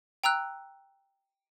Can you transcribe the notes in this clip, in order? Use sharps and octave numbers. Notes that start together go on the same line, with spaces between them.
G5 A#5 E6 F#6